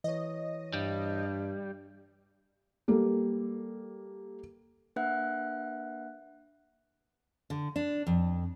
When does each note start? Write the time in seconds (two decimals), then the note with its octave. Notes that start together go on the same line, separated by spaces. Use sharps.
0.04 E3 C#5 D#5
0.73 G2 G3
2.88 G3 A#3 A4
4.96 A#3 D4 B4 E5 F#5 F#6
7.50 D3
7.76 D4
8.07 F2